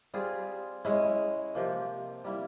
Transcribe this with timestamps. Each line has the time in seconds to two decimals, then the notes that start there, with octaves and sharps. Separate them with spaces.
0.14 G3 C4 F4 G#4
0.85 G#3 C#4 E4
1.55 C3 F3 A#3
2.24 G3 A#3 E4